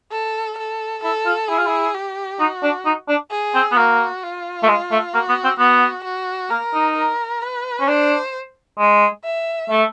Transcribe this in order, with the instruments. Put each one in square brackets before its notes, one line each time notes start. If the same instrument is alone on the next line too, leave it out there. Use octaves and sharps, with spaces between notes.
[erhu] A4
A4
[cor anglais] E4 [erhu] A4
[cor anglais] F4
[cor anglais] E4 [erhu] G#4
[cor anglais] F4
E4
[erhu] G4
[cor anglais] D#4 [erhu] F#4
[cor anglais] D4
D#4
D4
[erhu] G#4
[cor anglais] C4
B3
[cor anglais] A#3 [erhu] F#4
[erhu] F4
[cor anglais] A3
G#3
A3
[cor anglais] A#3 [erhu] F#4
[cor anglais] B3
C4
[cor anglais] B3 [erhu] F#4
[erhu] F#4
[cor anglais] A#3 [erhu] A#4
[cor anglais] D#4
[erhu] A#4
B4
[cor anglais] C#4
[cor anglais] D4 [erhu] C5
[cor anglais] G#3
[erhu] E5
[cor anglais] A3